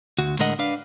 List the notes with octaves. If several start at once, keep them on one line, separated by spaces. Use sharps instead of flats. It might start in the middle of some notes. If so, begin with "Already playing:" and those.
D2 F#4
A2 D3 G#3 A#4 D#5 F#5
D4 B4 F5